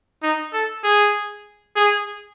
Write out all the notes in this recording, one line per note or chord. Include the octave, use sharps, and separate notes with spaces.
D#4
A4
G#4
G#4